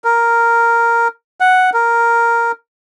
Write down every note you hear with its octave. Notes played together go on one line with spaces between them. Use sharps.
A#4
F#5
A#4